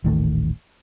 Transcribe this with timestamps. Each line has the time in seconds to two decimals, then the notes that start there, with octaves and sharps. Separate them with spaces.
0.04 D#1 A1 D#3 A3